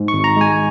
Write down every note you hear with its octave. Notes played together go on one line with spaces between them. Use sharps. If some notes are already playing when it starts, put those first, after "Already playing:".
Already playing: G#2
C#6
G#1
A#5
G#3 G#5